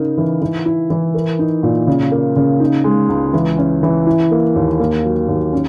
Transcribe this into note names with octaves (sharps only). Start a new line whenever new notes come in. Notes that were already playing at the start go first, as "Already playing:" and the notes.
Already playing: C#3 D#4 A#4
E3
E3
E4
E3
A#4
D#4
A#2
C#3
A#3
C#3
D#4
G#3
C#2
E3
C#4
E3
E4
A#3
D#2
A#3
F#3
D#2
C#4